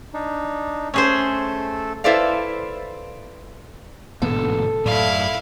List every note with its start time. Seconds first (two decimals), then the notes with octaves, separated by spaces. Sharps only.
0.14 D4 D#4
0.94 A3 C#4 G#4 A4 C5
2.04 E4 A4 B4 C5 D5 F5
4.22 A1 G#2 B2 D3 A#3 B3 A4
4.86 F#2 A2 E4 D5 F5